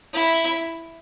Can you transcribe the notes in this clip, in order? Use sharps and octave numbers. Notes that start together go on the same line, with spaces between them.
E4